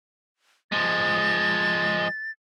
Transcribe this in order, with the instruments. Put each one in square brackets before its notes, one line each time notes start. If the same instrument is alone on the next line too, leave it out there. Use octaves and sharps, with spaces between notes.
[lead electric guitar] F3 G#3 [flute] A6